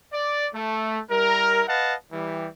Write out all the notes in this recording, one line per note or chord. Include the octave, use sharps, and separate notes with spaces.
D5
A3
G3 E4 A#4
B4 D#5 F5 F#5 A5
E3 G3